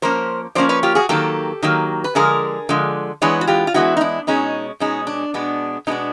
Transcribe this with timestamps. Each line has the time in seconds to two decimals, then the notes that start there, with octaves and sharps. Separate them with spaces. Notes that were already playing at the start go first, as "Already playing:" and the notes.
0.02 F3 A#3 C#4 A#4 C5
0.55 F3 A#3 C#4 C5 D5
0.69 B4 C#5
0.83 F4 G4
0.95 F#4 G#4
1.09 D#3 F#3 A#3 G4 A4
1.62 D#3 F#3 A#3
2.04 B4
2.15 D3 F3 G#3 G#4 A#4
2.69 D3 F3 G#3
3.22 E3 G#3 B3 D4 B4 C#5
3.41 F#4
3.47 F4 G4
3.67 F4
3.74 E3 G#3 B3 D4 E4 F#4
3.97 D#4
4.01 D4 E4
4.27 B2 G#3 C#4 D#4
4.80 B2 G#3 C#4 D#4
5.07 D4
5.34 B2 G#3 B3 D4
5.87 B2 G#3 B3 D4 D#4